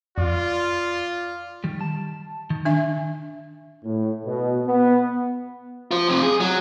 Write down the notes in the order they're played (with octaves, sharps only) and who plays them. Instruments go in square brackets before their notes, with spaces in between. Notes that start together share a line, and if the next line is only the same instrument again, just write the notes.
[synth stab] F2 [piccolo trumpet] F4 [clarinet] D5
[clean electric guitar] D#3 G3
A5
D#3
[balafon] D4 E5
[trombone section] A2
B2
B3
[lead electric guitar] F4 C5
F2 C3
G#4
F#3